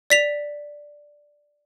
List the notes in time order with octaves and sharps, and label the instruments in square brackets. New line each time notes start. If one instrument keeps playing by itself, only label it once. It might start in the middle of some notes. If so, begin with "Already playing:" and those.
[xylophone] D5 B6 F7